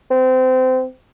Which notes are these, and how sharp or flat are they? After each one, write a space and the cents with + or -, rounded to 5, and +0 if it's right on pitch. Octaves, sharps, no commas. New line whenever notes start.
C4 -25